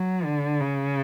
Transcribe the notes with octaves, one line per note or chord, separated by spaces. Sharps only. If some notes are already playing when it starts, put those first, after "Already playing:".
Already playing: F#3
D3
C#3